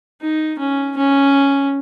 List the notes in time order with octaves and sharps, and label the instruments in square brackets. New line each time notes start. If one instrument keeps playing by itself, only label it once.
[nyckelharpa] D#4
C#4
C#4